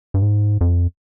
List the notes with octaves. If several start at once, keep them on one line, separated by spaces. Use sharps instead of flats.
G2
G#2
F2